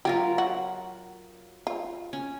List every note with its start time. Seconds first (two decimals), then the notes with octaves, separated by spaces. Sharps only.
0.05 F#3 F4 G4 A#4
0.38 F#4
1.67 F4
2.13 C#4